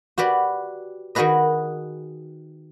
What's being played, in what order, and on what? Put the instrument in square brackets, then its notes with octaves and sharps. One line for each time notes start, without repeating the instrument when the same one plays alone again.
[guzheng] F#4 G4 B4 D5
D#3 D#4 F#4 G#4 B4 D#5